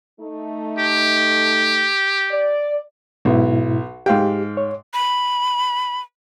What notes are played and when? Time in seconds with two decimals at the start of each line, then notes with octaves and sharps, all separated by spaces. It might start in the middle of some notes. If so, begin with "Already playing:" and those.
0.20 A3 D#4
0.79 G4
2.31 D5
3.25 B1 G#2 B2 E4
4.06 G#2 G4 F5 G5
4.57 C#5
4.94 B5